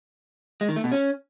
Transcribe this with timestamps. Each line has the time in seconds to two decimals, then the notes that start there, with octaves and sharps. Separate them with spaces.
0.61 G#3
0.69 D#3
0.76 A3
0.84 B2
0.92 C#4